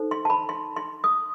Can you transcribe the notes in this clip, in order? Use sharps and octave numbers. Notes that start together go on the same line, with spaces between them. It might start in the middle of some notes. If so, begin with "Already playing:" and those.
Already playing: D#4 A4 C5
C6
A5
B5
C6
C6
D#6